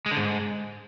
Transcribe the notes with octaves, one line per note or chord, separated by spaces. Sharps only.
G#3
D3
G#2